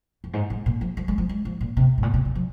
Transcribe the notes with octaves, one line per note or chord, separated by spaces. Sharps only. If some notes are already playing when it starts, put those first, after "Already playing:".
F2
G#2
G#2
A#2
F3
F3
G#3
F3
G#3
F3
A#2
C3
G#2
A#2
C3
C3
F3